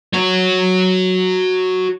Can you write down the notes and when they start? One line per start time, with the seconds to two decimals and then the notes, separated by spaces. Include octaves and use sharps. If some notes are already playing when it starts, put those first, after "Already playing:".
0.14 F#4 C#5